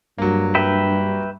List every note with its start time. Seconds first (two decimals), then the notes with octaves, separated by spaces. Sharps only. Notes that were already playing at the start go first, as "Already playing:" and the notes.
0.18 G2 F#3 A#3
0.55 B4 E5 G5